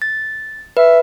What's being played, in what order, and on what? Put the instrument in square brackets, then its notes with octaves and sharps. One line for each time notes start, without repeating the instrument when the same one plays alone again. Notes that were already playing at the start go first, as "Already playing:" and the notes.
[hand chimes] A6
[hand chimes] B4 [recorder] E5